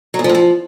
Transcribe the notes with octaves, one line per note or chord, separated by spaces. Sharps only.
F#3
E2
F3
A2
F3